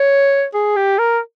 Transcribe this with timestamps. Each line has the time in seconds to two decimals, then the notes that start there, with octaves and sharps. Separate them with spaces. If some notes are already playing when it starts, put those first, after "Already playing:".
Already playing: C#5
0.54 G#4
0.77 G4
0.99 A#4